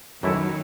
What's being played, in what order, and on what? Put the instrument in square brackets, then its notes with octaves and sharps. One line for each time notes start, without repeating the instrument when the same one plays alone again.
[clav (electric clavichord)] F#2 E3 A3 E4 [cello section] D#3 F#3